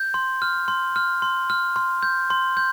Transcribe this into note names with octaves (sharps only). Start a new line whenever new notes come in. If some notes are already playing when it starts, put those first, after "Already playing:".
Already playing: G6
C6
F6
C6
F6
C6
F6
C6
G6
C6
G6